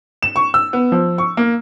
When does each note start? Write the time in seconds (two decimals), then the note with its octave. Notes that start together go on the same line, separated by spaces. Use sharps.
0.23 E7
0.36 C#6
0.54 E6
0.73 B3
0.92 F3
1.18 C#6
1.37 A#3